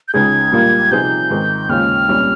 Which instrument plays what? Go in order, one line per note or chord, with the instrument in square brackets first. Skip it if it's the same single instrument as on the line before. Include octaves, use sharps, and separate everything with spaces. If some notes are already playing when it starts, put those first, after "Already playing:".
[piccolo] G6
[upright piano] C#2 C#3 G#3 D#4 G#4 [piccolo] G#6
[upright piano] A#1 A#2 G3 A#3 F4
[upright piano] C3 F3 C4 D#4 G#4 [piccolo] G6
[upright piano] G#2 D#3 G#3 C4
[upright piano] D#2 C#3 G#3 C#4 F4 [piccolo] F6
[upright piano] C2 A#2 G3 C#4